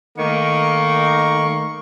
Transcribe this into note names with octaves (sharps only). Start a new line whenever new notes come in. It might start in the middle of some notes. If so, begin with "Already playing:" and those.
D#3 A3 A#3 C#6